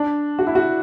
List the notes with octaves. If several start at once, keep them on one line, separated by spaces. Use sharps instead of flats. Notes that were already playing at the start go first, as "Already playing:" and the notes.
Already playing: D4
F#4
E4
F#4